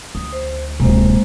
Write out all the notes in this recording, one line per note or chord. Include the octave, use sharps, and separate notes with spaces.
D2 D#6
C5
D1 C3 G#3 A#3 C5